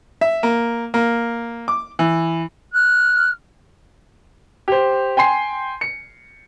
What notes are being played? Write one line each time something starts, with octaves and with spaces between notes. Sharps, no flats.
E5
A#3
A#3
D6
E3
F6 F#6
G4 C5
G5 G#5 C6 C7
C#7